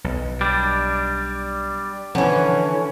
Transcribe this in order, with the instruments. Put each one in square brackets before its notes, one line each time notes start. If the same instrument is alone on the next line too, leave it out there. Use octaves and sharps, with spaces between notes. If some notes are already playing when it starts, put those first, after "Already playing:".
[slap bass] B1
[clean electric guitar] G3 D4
[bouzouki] D3 E3 [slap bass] F3 [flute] C#4